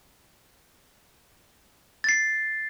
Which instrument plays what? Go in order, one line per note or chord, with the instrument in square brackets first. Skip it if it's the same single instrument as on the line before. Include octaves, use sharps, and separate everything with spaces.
[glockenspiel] A6 C7